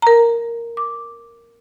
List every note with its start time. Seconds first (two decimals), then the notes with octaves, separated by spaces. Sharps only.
0.02 A#4 A#5
0.77 D6